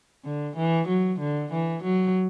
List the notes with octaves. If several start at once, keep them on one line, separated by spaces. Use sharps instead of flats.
D3
E3
F#3
D3
E3
F#3